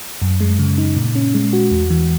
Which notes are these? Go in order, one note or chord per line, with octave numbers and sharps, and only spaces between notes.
F#2
G#3
C#3
D#4
A#2
C#4
G#3
F#4
E2
E3